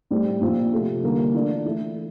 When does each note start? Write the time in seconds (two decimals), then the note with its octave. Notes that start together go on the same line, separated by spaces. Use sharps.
0.11 A2 G3 C4
0.41 A#2 F3 C4 F4
0.72 C3 F3 A3
1.03 D3 G3 A#3
1.34 E3 A3 D4 F4
1.65 E3 A3 E4